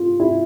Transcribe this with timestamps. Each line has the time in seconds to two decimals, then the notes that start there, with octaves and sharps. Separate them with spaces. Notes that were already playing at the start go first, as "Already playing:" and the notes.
Already playing: F4
0.20 E4